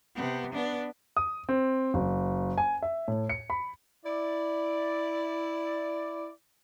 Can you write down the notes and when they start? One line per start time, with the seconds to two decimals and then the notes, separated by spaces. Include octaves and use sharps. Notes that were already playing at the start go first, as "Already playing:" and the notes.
0.15 C3 B3
0.54 B3 D4
1.17 D#6
1.49 C4
1.94 F#1
2.58 G#5
2.82 E5
3.08 A2
3.29 C#7
3.50 B5
4.04 E4 D5